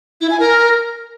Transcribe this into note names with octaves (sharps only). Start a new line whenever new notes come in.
E4
G#5
A#4